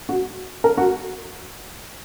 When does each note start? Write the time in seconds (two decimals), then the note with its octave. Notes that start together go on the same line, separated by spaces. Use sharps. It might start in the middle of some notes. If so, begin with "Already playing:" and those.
0.09 F#4
0.64 A#4
0.77 F#4